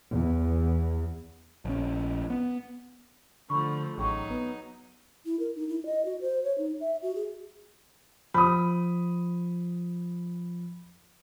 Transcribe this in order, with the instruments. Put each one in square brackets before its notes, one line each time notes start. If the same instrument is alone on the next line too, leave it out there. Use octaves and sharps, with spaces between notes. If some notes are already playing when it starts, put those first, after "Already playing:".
[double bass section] E2
[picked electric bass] A#1 C#4
B3
[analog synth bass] D3 [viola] F3 A3 [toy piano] B5 C#6
[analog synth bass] A1 [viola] F#3 D#4 [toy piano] G#4 G5 C#6
[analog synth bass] B3
[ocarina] E4
A#4
D#4
E4
D#5
F#4
C5
C#5
D#4
E5
F#4
G#4
[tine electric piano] F3 [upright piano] B5 D#6